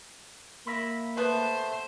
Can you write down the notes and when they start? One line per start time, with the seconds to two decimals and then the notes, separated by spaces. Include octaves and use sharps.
0.67 A#3 A#4 E5 B5
1.17 A3 B3 C5